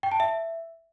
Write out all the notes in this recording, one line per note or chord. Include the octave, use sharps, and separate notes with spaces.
G5
A5
E5